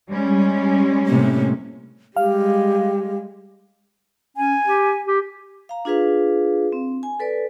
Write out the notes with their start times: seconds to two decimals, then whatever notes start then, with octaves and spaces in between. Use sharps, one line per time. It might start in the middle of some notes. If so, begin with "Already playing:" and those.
0.10 G3 G#3 C#4
1.07 A2 C3 A#3
2.16 G3 G#3 G4 F5
4.37 C#4 G#5
4.67 G4
5.06 G4
5.69 F5 A#5
5.85 D4 F4 G#4 B4 F5
6.72 C4
7.03 G#5
7.20 A4 B4 D5